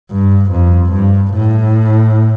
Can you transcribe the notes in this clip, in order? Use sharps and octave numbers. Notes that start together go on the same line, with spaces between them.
G2
F2
G2
A2